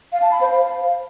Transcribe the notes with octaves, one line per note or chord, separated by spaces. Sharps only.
F5
A5
B5
C5
F5